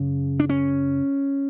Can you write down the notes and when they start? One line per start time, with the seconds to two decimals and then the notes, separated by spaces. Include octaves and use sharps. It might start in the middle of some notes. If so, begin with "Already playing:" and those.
Already playing: F#2 C#3
0.40 D4
0.49 C#4